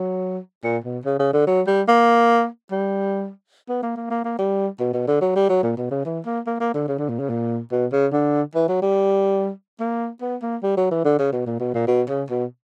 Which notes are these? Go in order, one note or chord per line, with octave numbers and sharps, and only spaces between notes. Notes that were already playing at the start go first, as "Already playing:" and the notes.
Already playing: F#3
A#2
B2
C#3
C#3
D3
F#3
G3
A#3
G3
B3
A#3
A#3
A#3
A#3
G3
B2
B2
D3
F#3
G3
F#3
A#2
B2
C#3
E3
A#3
A#3
A#3
D3
C#3
D3
A#2
C#3
A#2
B2
C#3
D3
E3
F#3
G3
A#3
B3
A#3
G3
F#3
E3
D3
C#3
B2
A#2
B2
A#2
B2
C#3
B2